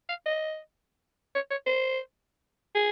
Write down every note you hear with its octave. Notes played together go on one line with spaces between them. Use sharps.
F5
D#5
C#5
C#5
C5
G#4